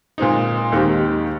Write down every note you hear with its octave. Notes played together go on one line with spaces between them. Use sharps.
A#2 G#3 C4 D#4
D#2 D#3 G#3 C4 G4